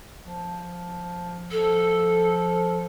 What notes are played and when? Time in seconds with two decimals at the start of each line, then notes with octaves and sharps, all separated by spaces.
0.22 F3
1.51 F3 A4